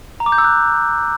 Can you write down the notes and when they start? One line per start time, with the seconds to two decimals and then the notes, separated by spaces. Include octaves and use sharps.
0.20 A#5
0.26 D6
0.32 G6
0.38 E6
0.44 F#6